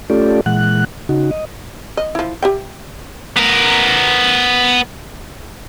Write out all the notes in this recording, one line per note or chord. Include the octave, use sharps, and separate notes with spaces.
A3 C#4 F4 G4 A4 D5
A#2 E3 G#3 F#5 F#6
C#3 D#4 F#4
D#5
D#5
F3 E4
G4 E5 G5
B3 A#4